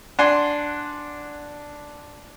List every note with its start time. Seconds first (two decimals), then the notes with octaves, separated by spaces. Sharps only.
0.19 D4 F#5 G#5 C6